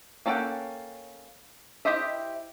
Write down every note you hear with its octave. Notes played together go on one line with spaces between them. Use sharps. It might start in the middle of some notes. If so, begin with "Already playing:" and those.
A#3 C#4 A4 F#5 G5
E4 G4 C5 D#5 E5